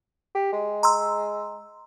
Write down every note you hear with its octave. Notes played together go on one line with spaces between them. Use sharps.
G4
G#3
A#5 C6 E6